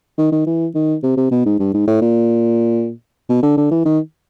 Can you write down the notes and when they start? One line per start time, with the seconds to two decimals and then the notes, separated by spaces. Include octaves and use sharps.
0.18 D#3
0.32 D#3
0.47 E3
0.75 D#3
1.03 C3
1.17 C3
1.31 B2
1.46 G#2
1.60 G2
1.74 G#2
1.88 A2
2.02 A#2
3.29 B2
3.43 D3
3.57 D3
3.71 E3
3.85 D#3